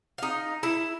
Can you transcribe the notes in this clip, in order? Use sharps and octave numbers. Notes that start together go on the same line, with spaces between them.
D#4 F5
E4